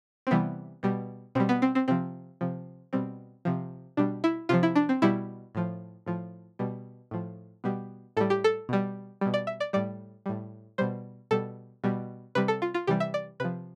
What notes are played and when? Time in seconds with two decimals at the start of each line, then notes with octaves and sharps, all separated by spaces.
0.27 C4
0.31 C3 E3 G3 B3
0.83 B2 G3
1.35 B2 G3 C4
1.49 B3
1.62 C4
1.75 C4
1.88 C3 F3 C4
2.41 C3 F3
2.93 B2 G3 C4
3.45 C3 F3
3.97 B2 G3 D4
4.24 E4
4.49 C3 F3 F4
4.63 E4
4.75 D4
4.89 C4
5.02 B2 G3 E4
5.55 A2 F3
6.06 A2 F3
6.59 B2 G3
7.11 A2 F3
7.64 B2 G3
8.17 A2 G3 A4
8.30 G4
8.44 A4
8.69 B2 G3
9.21 B2 G3
9.34 D5
9.47 E5
9.60 D5
9.73 A2 G3 D5
10.26 A2 G3
10.78 B2 G3 C5
11.31 B2 G3 A4
11.84 B2 G3
12.35 C3 G3 B4
12.48 A4
12.62 F4
12.74 F4
12.87 C3 E3 G3 G4
13.00 E5
13.14 D5
13.40 C3 F3 B4